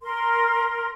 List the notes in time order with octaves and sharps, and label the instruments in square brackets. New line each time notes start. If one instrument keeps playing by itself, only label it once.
[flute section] A#4 C6